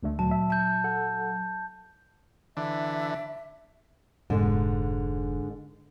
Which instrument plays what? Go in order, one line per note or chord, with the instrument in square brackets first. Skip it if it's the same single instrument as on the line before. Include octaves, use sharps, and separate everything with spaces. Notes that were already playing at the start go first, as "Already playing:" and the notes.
[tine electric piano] D2 D3 A3
[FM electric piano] A#2 F#3 [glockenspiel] A5
[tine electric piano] E5
[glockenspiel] A5 G6
[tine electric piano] A4 F#5
[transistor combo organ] D3 E3 D4 [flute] E5
[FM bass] F1 [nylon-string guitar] G#2 D3